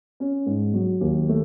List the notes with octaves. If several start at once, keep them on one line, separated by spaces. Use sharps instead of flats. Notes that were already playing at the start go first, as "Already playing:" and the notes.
C#4
G#2
F#3
D#2
A3